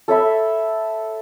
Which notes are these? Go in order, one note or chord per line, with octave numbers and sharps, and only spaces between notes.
A4 C#5 E5 B5